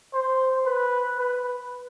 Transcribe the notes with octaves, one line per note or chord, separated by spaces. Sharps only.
C5
B4
B4